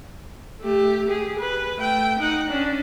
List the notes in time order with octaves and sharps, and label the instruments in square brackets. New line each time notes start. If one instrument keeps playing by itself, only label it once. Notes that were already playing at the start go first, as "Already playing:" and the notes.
[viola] A3 G4
G4 G#4
B4
A3 G5
D#4 F#5
C#4 D4